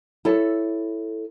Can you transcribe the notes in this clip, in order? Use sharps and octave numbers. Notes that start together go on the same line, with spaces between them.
E4 A4 C#5